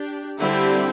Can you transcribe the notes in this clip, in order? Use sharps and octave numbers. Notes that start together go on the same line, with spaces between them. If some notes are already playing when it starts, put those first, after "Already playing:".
Already playing: D4 G4
D3 G3 C4 E4 G4